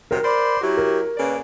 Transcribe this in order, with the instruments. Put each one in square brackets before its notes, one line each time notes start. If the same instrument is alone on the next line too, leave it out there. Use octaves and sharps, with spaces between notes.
[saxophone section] C3 D#3 F#3 [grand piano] A#4
[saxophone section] C5 D5 [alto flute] B5
[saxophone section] F#3 E4 F#4 [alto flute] G4
[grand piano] A#4
[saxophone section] C#3 A#3 D5 [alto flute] B4